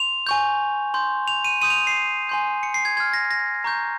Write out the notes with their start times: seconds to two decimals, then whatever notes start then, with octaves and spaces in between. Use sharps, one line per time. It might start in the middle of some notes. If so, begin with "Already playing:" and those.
Already playing: C6 F7
0.27 G#5 C#6 G6
0.94 C6 G6
1.28 F7
1.44 D#7
1.61 C6 D#6 G6 D#7
1.70 F7
1.87 C7
2.29 G#5 C6 G6
2.63 C#7
2.74 C7
2.85 G#6
2.97 C6 G#6
3.00 F6
3.13 A#6
3.31 A#6
3.64 A#5 C#6 G6